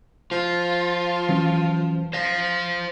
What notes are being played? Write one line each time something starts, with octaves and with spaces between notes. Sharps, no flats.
F3 F4
E3 F#3 C#4
C5 F5 A#6 C7